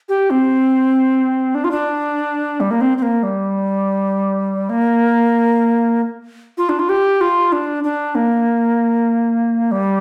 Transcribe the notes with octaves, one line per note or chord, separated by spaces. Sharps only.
G4
C4
D4
F4
D4
G3
A#3
C4
C4
A#3
G3
A#3
F4
D4
F4
G4
F4
D4
D4
A#3
G3